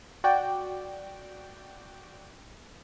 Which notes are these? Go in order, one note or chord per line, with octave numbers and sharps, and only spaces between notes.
F#4 D5 G5